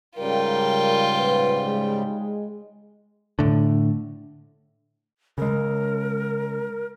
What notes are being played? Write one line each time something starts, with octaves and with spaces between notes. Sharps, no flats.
G#2 C#3 G3 F4 A#4 G5
C#2 A#2 B4
G#3
A2 D3
C#3 G#3 A#4